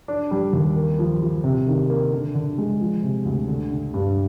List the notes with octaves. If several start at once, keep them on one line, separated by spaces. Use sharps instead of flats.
D4
G3
D#2
A#3
F3
F3
C3
D#3
A#3
D3
D3
G#3
F3
C3
D2
D3
D3
G2